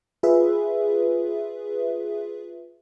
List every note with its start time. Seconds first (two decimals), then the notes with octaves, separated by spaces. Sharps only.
0.23 F4 G#4 B4 E5